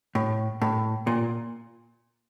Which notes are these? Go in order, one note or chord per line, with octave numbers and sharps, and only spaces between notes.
A2
A2
A#2